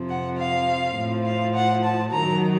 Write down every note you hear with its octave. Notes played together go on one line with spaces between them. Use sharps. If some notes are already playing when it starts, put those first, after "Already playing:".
Already playing: F2 C3 F3
F#5
F5
A2 F3
F5
F#5
A5
F#2 D#3 F#3 A#5